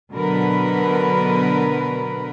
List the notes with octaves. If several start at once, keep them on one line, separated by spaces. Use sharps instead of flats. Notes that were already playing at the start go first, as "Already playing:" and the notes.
B2 D3 F#3 B3 A#4 B4